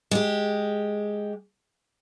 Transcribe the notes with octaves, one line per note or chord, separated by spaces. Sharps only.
G#3 G4